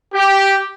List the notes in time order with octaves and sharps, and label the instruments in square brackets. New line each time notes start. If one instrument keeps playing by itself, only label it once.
[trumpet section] G4